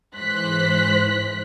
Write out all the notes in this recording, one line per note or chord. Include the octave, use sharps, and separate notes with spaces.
G#2 E3 C5 F#6 B6